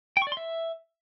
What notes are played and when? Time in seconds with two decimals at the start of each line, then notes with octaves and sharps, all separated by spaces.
0.17 G5
0.22 C#6
0.27 D5
0.32 C6
0.37 E5